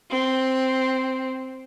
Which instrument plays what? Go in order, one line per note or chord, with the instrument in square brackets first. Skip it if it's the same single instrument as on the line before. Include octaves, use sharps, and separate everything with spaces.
[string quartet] C4